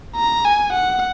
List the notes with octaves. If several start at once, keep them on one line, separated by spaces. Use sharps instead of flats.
A#5
G#5
F#5